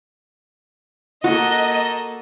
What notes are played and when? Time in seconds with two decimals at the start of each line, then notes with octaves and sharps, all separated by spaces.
1.24 A#3 F#4 A4 D#5